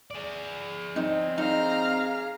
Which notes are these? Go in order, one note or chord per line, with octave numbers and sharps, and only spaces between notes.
G#4 D5
C4 D#4
D#4 F5 A#5 F6